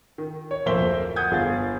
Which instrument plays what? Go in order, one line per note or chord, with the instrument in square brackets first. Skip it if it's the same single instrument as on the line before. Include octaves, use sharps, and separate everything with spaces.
[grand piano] D#3
C#5
D1 F2 A#3 C5 E5 G7
F#5 D#6 G6 G#6
G1 G#4 F5 A6